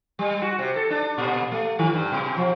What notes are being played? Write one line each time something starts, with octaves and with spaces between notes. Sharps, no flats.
G3
F#4
C3
A4
D4
A#2
A3
D#3
G2
B2
F3